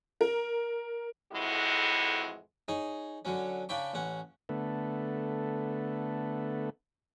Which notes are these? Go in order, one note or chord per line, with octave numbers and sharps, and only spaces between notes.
A#4
F2 A2 E3 G#3 E4 F#4
D#4 G#4 C#5
D3 F#3 C#4
C#3 D4 G5 B5 C#6
A1 C#4 F#5
D3 A3 B3